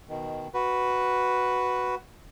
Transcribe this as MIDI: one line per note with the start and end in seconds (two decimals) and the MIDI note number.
0.09 0.48 47
0.09 0.48 51
0.54 1.95 66
0.54 1.95 71